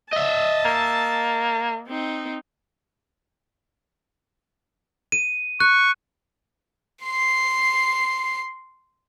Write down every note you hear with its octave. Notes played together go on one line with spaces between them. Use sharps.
D#5 E5 A5
A#3
C4 D#4
D#7
C#6 F#6
C6 C7